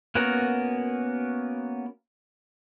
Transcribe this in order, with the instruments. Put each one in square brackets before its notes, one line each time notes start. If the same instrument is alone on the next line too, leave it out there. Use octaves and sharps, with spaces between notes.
[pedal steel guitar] A#3 B3 C#4 F#4 A#4